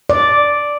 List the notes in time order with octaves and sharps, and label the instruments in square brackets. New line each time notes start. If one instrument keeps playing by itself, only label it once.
[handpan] D5